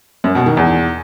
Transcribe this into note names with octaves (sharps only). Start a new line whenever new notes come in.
F#2
B2
D#3
E2